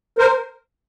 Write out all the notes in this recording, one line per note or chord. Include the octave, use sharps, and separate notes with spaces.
A#4 C5